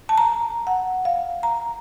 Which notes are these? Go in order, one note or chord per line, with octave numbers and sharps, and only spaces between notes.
A5
A#5
F#5
F5
A#5